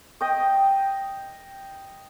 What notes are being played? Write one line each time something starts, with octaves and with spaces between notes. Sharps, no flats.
D#5 G5 D#6